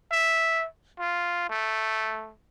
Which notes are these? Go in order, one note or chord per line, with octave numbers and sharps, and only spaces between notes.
E5
F4
A3